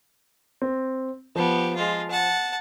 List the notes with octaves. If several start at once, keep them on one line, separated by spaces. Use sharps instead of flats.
C4
F3 B3 G4
G#3 F4
F#5 A5